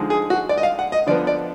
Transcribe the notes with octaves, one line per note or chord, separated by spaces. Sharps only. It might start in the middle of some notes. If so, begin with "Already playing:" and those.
Already playing: D3 F3 G#3 D#4
G#4
F#4
D5
D#5
F5
F#5
D#5
D3 F3 B3 D5
D5